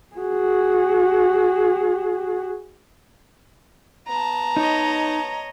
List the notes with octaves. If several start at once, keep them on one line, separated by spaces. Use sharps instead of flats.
F#4 G#4
B3 A5 A#5
D#4 C#5 D#5